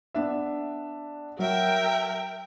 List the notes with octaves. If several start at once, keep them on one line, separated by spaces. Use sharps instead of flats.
B3 D4 E5
F#3 A#4 E5 G5